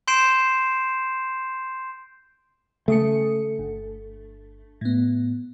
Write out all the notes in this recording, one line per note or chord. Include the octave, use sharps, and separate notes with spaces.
C6 G6 C7 D7 E7
C#3 A3 D#6 C#7
G1
A2 B3